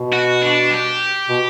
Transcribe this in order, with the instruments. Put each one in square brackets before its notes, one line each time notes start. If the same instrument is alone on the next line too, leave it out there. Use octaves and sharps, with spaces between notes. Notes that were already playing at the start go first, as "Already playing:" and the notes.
Already playing: [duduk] B2
[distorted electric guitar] F#4
D4
G4
[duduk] B2